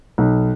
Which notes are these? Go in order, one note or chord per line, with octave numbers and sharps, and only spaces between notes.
B1